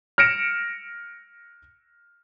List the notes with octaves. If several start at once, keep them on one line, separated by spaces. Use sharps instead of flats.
F6 A#6 C#7 D7 E7